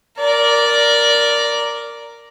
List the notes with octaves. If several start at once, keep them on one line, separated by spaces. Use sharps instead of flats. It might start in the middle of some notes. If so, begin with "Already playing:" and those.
A#4 D5